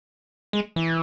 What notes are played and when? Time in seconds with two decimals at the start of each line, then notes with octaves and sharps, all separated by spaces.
0.53 G#3
0.76 E3